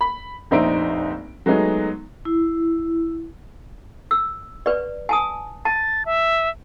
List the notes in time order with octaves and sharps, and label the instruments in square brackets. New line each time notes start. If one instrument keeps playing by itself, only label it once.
[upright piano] B5
F1 A#1 D#4 C5 E5 D7
F#3 G#3 A3 B3 D#4
[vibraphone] E4
[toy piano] E6
B4 D5
G#5 A5 D#6
[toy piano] A5 [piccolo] A6
[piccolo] E5